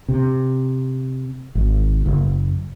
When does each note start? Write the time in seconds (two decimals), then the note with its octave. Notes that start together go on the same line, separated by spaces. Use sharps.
0.09 C3
1.55 G#1
2.06 F#1